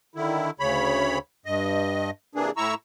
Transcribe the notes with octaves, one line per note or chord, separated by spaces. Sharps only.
D3 D#3 E4
D2 C#3 C#5 B5
G2 D#5
C3 E3 A#3 D4 G#4
A2 E4 A#5 C#6 E6